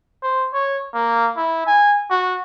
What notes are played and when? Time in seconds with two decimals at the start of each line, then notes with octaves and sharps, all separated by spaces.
0.23 C5
0.53 C#5
0.94 A#3
1.37 E4
1.67 G#5
2.10 F#4